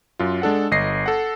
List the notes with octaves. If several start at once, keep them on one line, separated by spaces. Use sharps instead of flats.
F#2 F4
G#3 D4 A4 F#5
G1 D#5 A#6 C7
A4 F#5